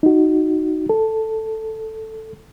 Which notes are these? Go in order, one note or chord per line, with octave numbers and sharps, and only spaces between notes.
D#4 F#4
A4